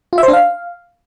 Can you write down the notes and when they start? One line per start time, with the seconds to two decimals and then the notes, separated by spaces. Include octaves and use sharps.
0.13 F4
0.18 E5
0.23 C5
0.28 D4
0.33 F5